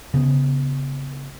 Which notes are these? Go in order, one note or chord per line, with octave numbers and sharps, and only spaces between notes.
C#3 B3